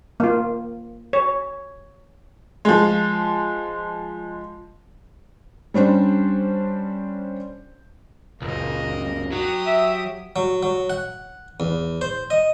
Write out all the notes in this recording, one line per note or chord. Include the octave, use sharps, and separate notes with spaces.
A#3 F4
C#5
F3 G#3
G3 C#4 D4 C5
C#2 F#2 A#3 D#5
F#3 G4 D#6
E5
F#3
F#3
F#5
E2
C5
D#5